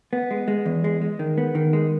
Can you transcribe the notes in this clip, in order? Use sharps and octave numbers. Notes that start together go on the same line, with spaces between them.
B3
G#3
G#3
E2
G#3
G#3
D#3
B3
D#3
G#3